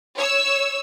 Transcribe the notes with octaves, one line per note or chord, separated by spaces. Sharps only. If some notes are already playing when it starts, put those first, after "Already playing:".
C#5 E6